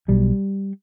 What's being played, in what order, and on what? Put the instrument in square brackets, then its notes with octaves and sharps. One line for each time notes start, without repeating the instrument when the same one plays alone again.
[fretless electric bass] B1 B2 G3